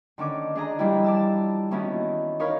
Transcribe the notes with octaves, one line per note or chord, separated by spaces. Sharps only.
D3 D#3 C#4 D6
D4 G#4 D#5 A#5
E3 F3 G3 D4 E4
D5 A5 E6
D#3 E3 B3 C#4 E4 F#4
D#4 A#4 C#5 F5 B5